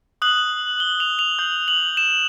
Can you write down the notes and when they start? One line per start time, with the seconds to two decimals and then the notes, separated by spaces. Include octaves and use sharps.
0.22 D#6 F#6 F#7
0.80 G7
1.00 F7
1.19 F7
1.39 D#6 G6
1.68 F#7
1.97 E7